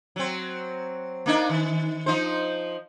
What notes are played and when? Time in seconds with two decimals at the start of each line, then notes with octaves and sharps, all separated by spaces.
0.16 F#3 C4
1.26 A#3 D4 D#4
1.49 D#3
2.06 F3 D#4 C5